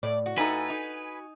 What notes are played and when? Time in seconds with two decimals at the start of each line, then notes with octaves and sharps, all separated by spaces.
0.03 A2 D5
0.26 F#4
0.38 A2 D#4 A4 B4 G#5
0.70 D#4